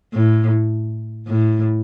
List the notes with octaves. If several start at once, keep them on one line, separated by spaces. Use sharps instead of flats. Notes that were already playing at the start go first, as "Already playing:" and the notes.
A2
A2